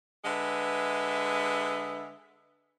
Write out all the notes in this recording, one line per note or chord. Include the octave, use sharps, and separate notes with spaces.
D3 G#3 B4 E5